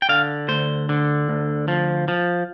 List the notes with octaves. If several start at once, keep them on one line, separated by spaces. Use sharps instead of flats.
G5
D3 F5
D2 C5
D3
D2
F3
F3